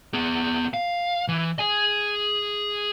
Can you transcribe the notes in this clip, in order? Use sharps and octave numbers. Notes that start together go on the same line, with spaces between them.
B3 G#4
F5
E3
G#4 G#5